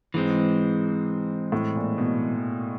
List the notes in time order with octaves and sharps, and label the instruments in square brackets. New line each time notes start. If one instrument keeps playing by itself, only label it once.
[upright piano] G#2 [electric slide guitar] E3 G#3 C4
[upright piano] A2
A#2
B2